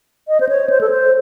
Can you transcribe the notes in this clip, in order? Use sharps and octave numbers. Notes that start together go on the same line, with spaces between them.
D#5
C5
C#5
C5
A4
C5